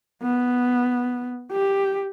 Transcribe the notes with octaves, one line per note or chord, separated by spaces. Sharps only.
B3
G4